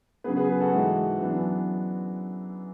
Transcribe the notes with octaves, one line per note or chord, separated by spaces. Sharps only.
C#3 F#3 B3 G#4 B4
G#4 B4
G#4 B4
F#4 A4
G#2 E3 G#3
F#2 E3 B3 D4